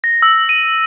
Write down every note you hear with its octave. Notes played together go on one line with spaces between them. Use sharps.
A#6
E6
D#7